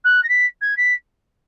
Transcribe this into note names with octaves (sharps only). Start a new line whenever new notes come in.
F#6
A#6
B6
G#6
B6